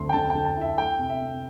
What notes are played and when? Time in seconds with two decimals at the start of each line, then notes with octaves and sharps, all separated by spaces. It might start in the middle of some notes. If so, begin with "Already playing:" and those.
Already playing: D2 D3 C4 C6
0.09 G5
0.13 D3 A5
0.30 D3 G5
0.45 A5
0.57 E4 E5
0.77 A3 G5
0.99 C3
1.09 E5
1.20 C3